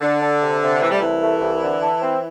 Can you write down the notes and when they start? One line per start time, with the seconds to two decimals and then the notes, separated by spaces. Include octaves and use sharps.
0.01 D3 D4
0.21 D4
0.41 C3
0.62 C3
0.81 E3 A3
0.91 G3
0.99 C2 E3
1.21 A3
1.41 C2
1.62 D3
1.81 A4
2.01 C4